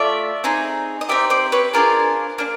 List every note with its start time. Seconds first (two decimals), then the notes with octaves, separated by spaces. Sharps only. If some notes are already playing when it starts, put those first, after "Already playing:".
Already playing: A3 F4 D5 E5
0.44 C4 D#4 G#4
1.01 D#5
1.09 C4 D#4 G4 D5 E5
1.30 C5 D5
1.52 B4 C#5
1.73 D4 F4 G#4 A#4 C5
2.38 A#3 D4